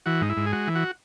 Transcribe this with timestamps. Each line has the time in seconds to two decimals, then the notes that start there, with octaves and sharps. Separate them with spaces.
0.06 E3 F#4
0.21 G#2 D#4
0.29 E4
0.37 G#2
0.46 G#4
0.52 G#3 F#4
0.68 E3
0.75 F#4